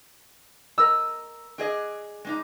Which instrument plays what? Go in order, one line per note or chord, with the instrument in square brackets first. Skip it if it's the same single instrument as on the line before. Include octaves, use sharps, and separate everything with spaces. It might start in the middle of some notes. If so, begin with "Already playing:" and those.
[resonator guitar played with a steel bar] A#4 D#5 [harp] E6
[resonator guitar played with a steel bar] D4 G#4 D#5
G#3 D4 D#4